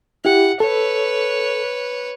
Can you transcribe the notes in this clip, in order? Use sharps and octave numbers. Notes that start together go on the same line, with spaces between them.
E4 G4 F#5
A4 B4 C#5